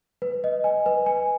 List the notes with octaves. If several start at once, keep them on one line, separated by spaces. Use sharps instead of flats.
B4
D#5
G#5
B4
G#5